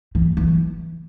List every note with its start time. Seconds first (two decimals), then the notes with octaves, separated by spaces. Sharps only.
0.15 E3
0.37 E3